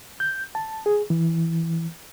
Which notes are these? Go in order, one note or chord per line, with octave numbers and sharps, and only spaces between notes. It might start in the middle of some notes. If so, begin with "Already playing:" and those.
G6
A5
G#4
E3